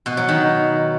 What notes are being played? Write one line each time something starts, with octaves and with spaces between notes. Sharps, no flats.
B2
F#3
D#3